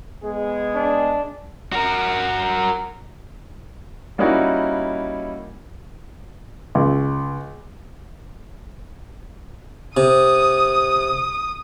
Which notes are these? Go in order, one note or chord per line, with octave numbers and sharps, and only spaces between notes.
G#3 B3 G#4
D4
F#4 A#4
G3 A#3 C#4 D#4 E4 F#4
C#2
C3 D#6